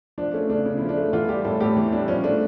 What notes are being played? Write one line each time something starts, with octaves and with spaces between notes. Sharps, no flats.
F3 D4
A3 C#4
C#3 D4
C#3
E4
F3
D4
A3
E3 F4
G3 G4
A2 A4
A2 G4
E3
G3 D4
F3 C#4
A3 D4